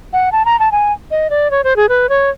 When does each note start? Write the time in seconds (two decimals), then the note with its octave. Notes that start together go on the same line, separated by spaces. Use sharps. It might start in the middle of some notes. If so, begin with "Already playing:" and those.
0.13 F#5
0.32 A5
0.45 A#5
0.59 A5
0.72 G#5
1.11 D#5
1.30 D5
1.51 C#5
1.64 C5
1.76 G#4
1.89 B4
2.09 C#5